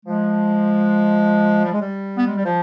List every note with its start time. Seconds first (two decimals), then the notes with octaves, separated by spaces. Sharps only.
0.05 F3 G#3
1.65 G3
1.72 G#3
1.79 G3
2.17 B3
2.27 G#3
2.36 G3
2.45 F3